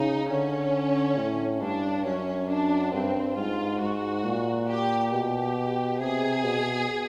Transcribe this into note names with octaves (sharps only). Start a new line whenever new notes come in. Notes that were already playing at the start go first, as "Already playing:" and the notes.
Already playing: C#3 D#4
D3 C#4
A2
G2 D4
F#2 C#4
D4
G2 C4
G#2 F4
G#2 F#4
A#2
G4
B2 G4
C3 G#4
B2